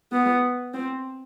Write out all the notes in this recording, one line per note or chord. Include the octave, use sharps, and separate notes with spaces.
B3
C4